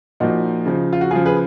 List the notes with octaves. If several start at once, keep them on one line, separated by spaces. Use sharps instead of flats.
A#2 F3 D#4 F#4
C#3 F3
F4
F#4
C#3 F3 F4 G#4
G#4 B4